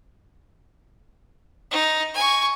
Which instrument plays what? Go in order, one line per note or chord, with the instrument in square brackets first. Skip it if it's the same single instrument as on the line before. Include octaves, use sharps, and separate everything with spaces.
[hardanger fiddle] D#4
G#5 C#6